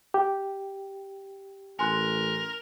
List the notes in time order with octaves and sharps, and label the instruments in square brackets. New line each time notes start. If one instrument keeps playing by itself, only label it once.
[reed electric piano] G4
[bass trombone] A1 [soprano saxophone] A#4 [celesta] G#5 C6 F#6